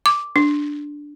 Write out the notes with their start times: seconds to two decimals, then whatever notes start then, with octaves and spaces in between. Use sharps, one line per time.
0.06 D6
0.36 D4